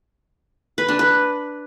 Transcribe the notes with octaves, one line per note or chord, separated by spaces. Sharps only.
B4
D4
B4